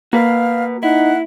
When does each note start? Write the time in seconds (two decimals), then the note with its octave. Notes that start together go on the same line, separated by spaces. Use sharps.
0.13 A#3 F#4 B4 F5
0.83 D#4 E4 F#5